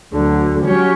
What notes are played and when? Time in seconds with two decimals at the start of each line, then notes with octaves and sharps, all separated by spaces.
0.13 D2 D3 F#3
0.64 F#3 C#4 G4 C#5